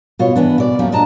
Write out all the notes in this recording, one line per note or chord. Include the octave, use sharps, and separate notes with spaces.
B2 F4 C#5
E3 B3 D4
B2 D5
F#2 A3 A#3 C#4
A#2 D4 D#5 A5 A#5